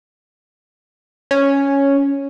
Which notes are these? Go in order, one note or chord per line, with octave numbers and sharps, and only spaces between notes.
C#4